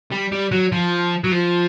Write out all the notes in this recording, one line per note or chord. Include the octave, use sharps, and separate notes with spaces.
G3
G3
F#3
F3
F#3
F3